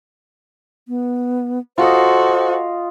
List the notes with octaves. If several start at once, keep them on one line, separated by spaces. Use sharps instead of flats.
B3
F4 F#4 A4 C5 D#5